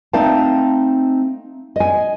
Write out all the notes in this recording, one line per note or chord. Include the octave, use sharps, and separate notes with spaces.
A3 C4 D#4 F5 A5
D#5 G#5